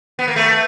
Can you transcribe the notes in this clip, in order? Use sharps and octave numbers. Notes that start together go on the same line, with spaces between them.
B3
A#3
A3